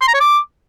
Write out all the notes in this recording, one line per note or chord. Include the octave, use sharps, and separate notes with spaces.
C6
A#5
C#5
D6